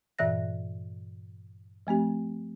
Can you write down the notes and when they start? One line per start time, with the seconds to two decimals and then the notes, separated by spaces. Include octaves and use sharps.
0.19 G2 A#2 E3 E5 F#6 A#6
1.87 F3 A3 C4 G4